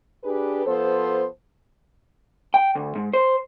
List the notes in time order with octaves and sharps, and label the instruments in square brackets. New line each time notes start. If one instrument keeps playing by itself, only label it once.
[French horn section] D4 G4 G#4 B4
F3 B3 A4 C5
[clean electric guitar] G5
D2
G#2
C5